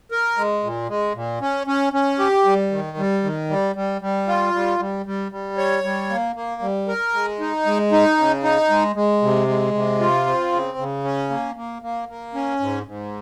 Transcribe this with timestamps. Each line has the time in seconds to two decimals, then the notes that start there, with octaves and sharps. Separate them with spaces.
0.11 A#4
0.37 G#3
0.64 A#2
0.89 G#3
1.15 A#2
1.41 C#4
1.67 C#4
1.93 C#4
2.19 G4
2.45 G3
2.71 D#3
2.98 G3
3.24 D#3
3.50 G3
3.76 G3
4.01 G3
4.28 F4
4.54 G3
4.79 G3
5.06 G3
5.32 G3
5.58 C#5
5.84 G3
6.10 A#3
6.36 A#3
6.62 G3
6.88 A#4
7.14 G#3
7.40 D#4
7.66 G#3
7.92 D#4
8.18 C#3
8.44 D#4
8.70 G#3
8.96 G#3
9.22 C3
9.48 G#3
9.74 C3
10.00 F4
10.26 C4
10.52 C#3
10.78 C#3
11.04 C#4
11.30 A#3
11.56 A#3
11.82 A#3
12.09 A#3
12.34 C#4
12.60 G#2
12.86 G#2